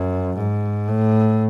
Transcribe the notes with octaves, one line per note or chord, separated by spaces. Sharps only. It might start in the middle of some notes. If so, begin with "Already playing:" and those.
Already playing: F#2
G#2
A2